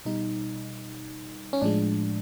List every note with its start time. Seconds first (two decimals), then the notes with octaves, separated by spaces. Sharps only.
0.05 B2 G3 D#4
1.53 C#4
1.62 A2 F3 G#3 D4